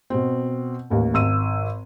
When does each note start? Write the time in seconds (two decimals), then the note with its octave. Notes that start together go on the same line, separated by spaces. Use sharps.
0.10 B2 C4
0.90 A1 D#2
1.14 G#1 E6 D#7